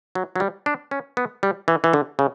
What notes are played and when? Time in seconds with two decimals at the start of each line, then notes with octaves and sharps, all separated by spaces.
0.15 F#3
0.36 F#3
0.40 G3
0.66 D4
0.91 C#4
1.17 B3
1.43 G3
1.68 E3
1.84 E3
1.93 D3
2.19 C#3